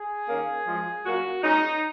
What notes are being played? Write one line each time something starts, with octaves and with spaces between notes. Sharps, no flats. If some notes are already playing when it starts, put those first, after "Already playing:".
Already playing: G#4
D#3 A#3 C#4
F#2 F3 G#3
A#2 F#3 A#3 C#4 F#4
A#2 G#3 C#4 D#4